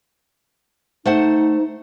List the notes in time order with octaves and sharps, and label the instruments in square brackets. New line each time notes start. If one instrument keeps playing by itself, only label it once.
[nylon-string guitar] A3 C5 F#5 [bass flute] D#4